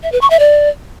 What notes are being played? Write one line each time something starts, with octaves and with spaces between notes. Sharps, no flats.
E5
B4
C#6
E5
D5